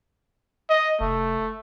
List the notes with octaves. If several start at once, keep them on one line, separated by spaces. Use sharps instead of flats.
D#5
F1 A3